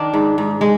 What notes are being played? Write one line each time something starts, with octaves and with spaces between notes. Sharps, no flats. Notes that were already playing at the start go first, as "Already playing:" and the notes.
Already playing: D#3 D4
G#2
G#2
G#3